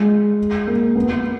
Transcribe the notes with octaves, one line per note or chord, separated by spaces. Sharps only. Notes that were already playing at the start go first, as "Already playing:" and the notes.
Already playing: G#3
A#3
B3